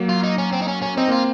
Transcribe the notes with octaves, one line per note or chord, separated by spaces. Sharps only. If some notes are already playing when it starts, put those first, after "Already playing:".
Already playing: F#3 A#3
F4
D#4
C#4
C4
D#4
C#4
C#4
C4 D#4
A#3 F4